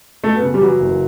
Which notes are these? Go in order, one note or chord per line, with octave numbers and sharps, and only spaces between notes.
F#2 A3
B3
C#3
G3
E3 F#3
F#1